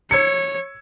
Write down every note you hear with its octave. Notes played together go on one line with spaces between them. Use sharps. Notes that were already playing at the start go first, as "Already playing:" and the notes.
C#5 E6 G#6 C#7